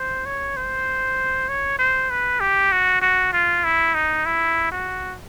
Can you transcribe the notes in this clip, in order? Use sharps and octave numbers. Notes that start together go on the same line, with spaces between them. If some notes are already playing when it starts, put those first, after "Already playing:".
Already playing: C5
C#5
C5
C#5
C5
B4
G4
F#4
F#4
F4
E4
D#4
E4
F#4